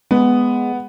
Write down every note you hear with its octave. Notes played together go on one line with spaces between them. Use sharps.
G#3 B3